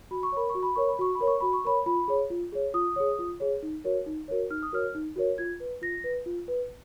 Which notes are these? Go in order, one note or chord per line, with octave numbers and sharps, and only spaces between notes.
F#4 B5
C#6
A#4 C#5 B5
C#6
F#4
B5
A#4 C#5 C#6
B5
F#4 C#6
B5
A#4 C#5
C#6
F#4 B5
C#6
A#4 C#5 B5
F4 B5
G#4 C#5
F4
G#4 C#5
F4 D#6
G#4 C#5
F4
G#4 C#5
D#4
F#4 A#4 C#5
D#4
F#4 A#4 C#5
D#4 F6
D#6
F#4 A#4 C#5 F6
D#4
F#4 A#4 C#5
F4 G#6
B4
F4 A#6
B4
F4
B4